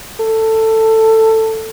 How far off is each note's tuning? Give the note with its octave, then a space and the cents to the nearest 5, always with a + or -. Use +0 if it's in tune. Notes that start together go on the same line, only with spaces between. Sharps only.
A4 +15